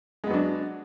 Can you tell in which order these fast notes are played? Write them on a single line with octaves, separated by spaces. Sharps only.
G#3 B3 F#3 D4